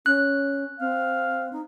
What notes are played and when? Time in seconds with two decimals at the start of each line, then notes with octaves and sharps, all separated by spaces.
0.06 C#4 F#6
0.80 C4 F5
1.53 D#4